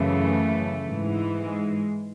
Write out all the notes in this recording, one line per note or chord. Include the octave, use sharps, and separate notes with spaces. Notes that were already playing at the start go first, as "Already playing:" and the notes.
Already playing: F#2 C#3 E3 A3
G#2 E3
G#3